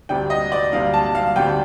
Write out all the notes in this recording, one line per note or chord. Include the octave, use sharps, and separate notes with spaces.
D2 C3 G3 D4 G5
D#5
D5
D2 C3 G3 D4 F5
A5
F5
D2 C3 G3 D4 G5